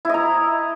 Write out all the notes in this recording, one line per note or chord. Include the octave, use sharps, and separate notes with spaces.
E4 D#5 A#5